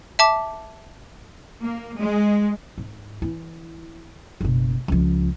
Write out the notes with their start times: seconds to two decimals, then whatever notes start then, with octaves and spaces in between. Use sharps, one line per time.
0.19 E5 A5 D6
1.62 A#3
1.98 G#3
2.78 G#2
3.22 E3 E4
4.41 F#1 B2
4.88 C#2 F3